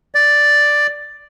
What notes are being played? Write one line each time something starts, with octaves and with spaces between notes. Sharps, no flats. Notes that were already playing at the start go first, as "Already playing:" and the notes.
D5